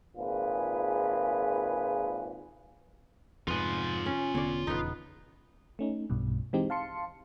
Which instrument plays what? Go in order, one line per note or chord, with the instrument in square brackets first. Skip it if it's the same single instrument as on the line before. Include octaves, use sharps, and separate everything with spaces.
[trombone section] G#1 A#2 F4 G#4 B4
[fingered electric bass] F2 G#2 [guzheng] B3 [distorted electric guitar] F4 G#5
[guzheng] C#4
[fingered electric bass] E1 D3 B3 [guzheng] C#5 D5
[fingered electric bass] D#1 E2 C#3 [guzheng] B3 D#4
[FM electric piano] A3 C#4 D#4
B1 G2 B2
E3 G#3 C4 D#4 G4
F5 A5 C6 C#7